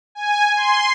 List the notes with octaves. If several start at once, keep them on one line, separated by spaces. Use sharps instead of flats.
G#5
C6